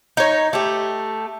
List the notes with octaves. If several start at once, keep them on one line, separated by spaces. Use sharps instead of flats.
D#4 C#5
A3 G4